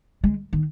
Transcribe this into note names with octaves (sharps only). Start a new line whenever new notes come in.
G#3
D#3